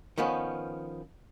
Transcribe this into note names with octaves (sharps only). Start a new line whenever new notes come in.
D#3 F3 B3 C#4